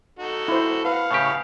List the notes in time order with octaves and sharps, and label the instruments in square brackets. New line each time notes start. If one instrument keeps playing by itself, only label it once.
[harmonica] D#4 F#4 A4
[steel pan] E4 C5
[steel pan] B4 [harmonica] F5 F#5
[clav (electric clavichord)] A2 C#3 G4